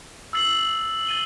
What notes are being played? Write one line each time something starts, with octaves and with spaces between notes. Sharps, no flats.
E6 A6 C7 F#7
A6 D#7 G7